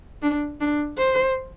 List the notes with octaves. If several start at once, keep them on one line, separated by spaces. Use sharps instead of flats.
D4
D4
C5